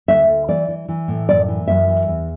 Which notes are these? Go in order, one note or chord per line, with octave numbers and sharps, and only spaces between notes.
D2 E5
D2
E3 D5
E3
E3
A2
F#2 D5
E3
F#2 E5
E3
E2